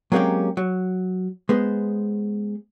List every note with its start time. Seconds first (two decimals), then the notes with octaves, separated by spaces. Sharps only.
0.12 F#3 G#3 A#3 C4 C#4 G4
0.57 F#3
1.49 G#3 B3 C5